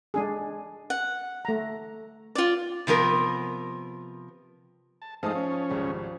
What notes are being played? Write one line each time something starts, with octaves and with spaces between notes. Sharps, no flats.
G#3 D4 G#4
F#5
A3 A#5
F4 D5
C3 F3 B3 A#4
A5
F3 G#3 A3 D#4 F5 A5 D#6
C#4
G#1 C#2 G3